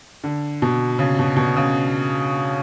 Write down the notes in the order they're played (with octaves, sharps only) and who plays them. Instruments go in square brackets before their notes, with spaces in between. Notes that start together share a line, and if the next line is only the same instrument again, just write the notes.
[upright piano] D3
B2
C#3
B2
B2
C#3